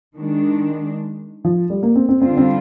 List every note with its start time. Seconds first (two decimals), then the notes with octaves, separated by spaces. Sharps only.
0.17 D#3 G#3 D4
1.45 F3
1.70 G3
1.83 A#3
1.96 C4
2.09 C4
2.21 D3 G3 C4 D4 F4
2.37 C4